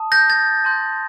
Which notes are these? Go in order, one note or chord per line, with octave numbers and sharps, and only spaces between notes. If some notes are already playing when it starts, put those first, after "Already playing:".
Already playing: A5 D#6
G6 A#6
A6
A5 C6 G6